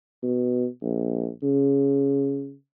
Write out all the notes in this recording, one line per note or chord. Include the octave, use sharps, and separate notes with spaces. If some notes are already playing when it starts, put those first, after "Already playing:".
B2
A#1
C#3